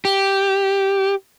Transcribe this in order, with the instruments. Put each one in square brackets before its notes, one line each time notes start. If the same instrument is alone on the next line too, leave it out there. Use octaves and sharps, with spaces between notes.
[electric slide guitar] G4